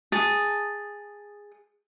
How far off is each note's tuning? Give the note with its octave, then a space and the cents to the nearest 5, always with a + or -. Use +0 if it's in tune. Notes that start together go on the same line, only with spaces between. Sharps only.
G#4 -10 A5 +0 D#6 +0